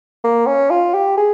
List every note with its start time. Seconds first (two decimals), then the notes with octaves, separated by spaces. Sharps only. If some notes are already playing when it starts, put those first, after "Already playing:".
0.24 A#3
0.46 C#4
0.70 F4
0.94 G4
1.17 G#4